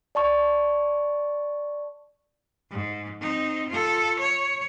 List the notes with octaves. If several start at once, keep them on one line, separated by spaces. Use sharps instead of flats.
D5 A5 C#6
G#2
C4 D#4
F4 A4
C#5